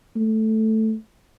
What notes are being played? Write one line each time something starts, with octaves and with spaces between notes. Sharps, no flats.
A3